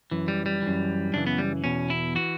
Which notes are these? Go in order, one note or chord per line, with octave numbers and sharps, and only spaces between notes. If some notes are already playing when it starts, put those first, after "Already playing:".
F#2 E3
G3
G3
E3
F#2
F#2 C#3 E3 D4
B3
G3
E2 B2 C#4
E4
E3 F#4